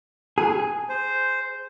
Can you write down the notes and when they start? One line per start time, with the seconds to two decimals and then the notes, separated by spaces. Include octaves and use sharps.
0.38 G#4
0.89 C5